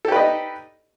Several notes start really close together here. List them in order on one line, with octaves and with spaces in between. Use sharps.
A4 G4 B4 D#5 D#4